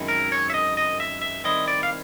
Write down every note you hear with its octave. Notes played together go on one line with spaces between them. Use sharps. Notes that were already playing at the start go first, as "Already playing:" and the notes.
Already playing: F#2 D#3 G#3 C4 E4
A#4
C#5
E5
D#5
D#5
E5
E5
D#3 G3 C4 E4 D#5
D5
F5